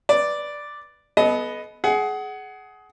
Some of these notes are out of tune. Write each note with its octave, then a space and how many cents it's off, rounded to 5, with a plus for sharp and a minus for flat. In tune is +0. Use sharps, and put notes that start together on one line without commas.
B4 +0 D5 +0
B3 +0 A4 -40 D#5 +0
G#4 +20 F#5 +20